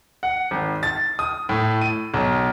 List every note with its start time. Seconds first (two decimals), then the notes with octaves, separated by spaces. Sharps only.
0.23 F#5
0.51 G#1
0.83 A6
1.19 D#6
1.49 A2
1.81 D#7
2.14 B1